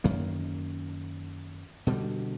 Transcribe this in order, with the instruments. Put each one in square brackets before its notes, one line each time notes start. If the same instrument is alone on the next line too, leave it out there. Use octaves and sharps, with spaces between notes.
[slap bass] F#2 D#3 A#3
B2 D3 G3